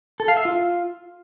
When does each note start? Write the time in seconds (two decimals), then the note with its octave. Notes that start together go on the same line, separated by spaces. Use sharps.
0.20 A4
0.28 F5
0.37 E5
0.45 F4